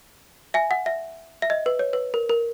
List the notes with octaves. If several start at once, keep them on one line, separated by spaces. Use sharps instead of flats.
E5 G#5
F#5
E5
E5
D#5
B4
C#5
B4
A#4
A#4